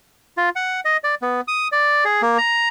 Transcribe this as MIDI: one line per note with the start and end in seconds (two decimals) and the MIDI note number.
0.37 0.49 65
0.56 0.80 78
0.85 0.97 75
1.04 1.15 74
1.22 1.41 59
1.48 1.68 87
1.72 2.04 74
2.05 2.22 68
2.22 2.38 58
2.38 2.69 82